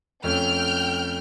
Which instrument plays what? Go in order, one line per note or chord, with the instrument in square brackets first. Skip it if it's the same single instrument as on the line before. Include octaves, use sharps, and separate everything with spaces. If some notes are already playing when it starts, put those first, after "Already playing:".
[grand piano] F2 A3 C#4 [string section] G5 F6 G6